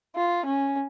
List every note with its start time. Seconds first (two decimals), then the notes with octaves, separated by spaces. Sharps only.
0.16 F4
0.45 C#4